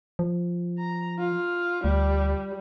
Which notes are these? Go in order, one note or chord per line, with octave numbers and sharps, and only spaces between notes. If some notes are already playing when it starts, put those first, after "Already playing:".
F3
A#5
F4
D2 G3